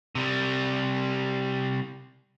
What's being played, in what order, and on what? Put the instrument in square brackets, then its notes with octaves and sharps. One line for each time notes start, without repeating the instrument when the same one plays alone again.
[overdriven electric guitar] C3 G3